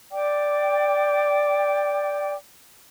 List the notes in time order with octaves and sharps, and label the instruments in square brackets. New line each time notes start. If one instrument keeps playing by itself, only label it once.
[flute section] D5 G5 D6